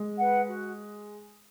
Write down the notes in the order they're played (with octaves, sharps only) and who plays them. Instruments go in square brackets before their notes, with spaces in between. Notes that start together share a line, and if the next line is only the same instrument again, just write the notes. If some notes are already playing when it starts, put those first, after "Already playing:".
Already playing: [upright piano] G#3
[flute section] B4 F#5
F#4